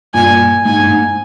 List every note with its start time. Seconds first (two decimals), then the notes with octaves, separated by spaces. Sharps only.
0.14 G2 A#2 G#5
0.65 G#2 G#5
0.83 G#2